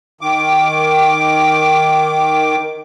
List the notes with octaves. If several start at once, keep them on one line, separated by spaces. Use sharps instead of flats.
D#3 D6